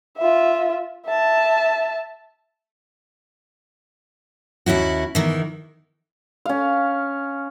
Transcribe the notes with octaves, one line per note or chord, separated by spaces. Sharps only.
F4 E5
E5 A5
D#2 C#4 E4 F#4
E2 D#3 E3
C#4 F5